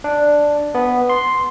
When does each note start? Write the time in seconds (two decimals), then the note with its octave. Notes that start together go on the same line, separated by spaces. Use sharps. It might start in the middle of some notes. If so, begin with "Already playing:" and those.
0.04 D4
0.75 B3
1.10 C6